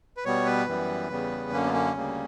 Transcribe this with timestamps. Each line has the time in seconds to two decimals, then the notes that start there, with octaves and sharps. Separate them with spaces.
0.17 B4
0.25 B2 G3 B3 C#5
0.46 B4
0.67 F#2 E3 G3 B3
1.10 E2 C#3 G3 B3
1.52 F#2 D3 A#3 C#4
1.64 B3
1.74 C#4
1.95 D2 C#3 G3 A#3